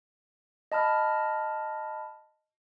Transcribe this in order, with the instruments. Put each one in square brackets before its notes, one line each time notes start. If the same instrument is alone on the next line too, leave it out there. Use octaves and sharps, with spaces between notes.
[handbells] D#5 A5 B5 F6